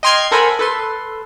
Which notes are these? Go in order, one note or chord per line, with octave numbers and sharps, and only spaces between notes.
D#5 G5 C6 F6 G#6 C7
A4 A#4 C5 F#5 G#5 B5
A4 B4 C6